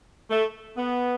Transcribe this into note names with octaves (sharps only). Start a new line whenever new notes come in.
A3
B3